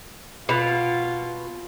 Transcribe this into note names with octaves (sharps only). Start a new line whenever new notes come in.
B2 F4